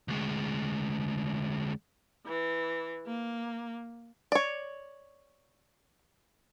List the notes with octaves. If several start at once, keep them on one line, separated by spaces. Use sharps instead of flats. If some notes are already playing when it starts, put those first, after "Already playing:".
D2 G#3
E3
A#3
C#5 D5